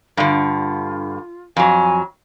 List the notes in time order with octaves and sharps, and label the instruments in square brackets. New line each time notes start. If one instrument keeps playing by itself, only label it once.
[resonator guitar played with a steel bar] G2 D3 [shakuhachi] F4
[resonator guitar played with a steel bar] F2 F#3 [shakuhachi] G#5